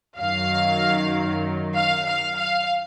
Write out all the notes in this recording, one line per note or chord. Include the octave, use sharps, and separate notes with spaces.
F#2 D#3 F#3 F5
F5
F5
F5